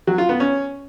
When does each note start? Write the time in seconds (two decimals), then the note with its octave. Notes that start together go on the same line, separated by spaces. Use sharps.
0.07 F#3
0.18 F4
0.29 B3
0.40 C#4